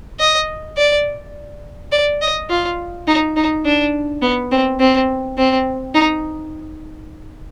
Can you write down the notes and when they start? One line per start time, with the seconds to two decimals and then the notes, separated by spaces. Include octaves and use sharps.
0.20 D#5
0.77 D5
1.92 D5
2.22 D#5
2.50 F4
3.07 D#4
3.37 D#4
3.65 D4
4.22 B3
4.51 C4
4.80 C4
5.37 C4
5.94 D#4